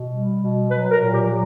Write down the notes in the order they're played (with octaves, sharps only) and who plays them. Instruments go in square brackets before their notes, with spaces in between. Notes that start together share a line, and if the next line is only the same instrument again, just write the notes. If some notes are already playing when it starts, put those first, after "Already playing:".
Already playing: [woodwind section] B2
G3
B2
F#3 B4
A#4
A#2
G4
F#3